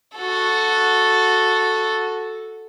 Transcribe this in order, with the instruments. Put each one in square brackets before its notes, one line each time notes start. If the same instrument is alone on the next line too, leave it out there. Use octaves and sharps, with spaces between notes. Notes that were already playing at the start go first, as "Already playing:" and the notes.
[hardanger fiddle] F#4 A4